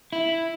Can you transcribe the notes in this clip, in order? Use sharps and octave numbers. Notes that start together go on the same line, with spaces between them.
E4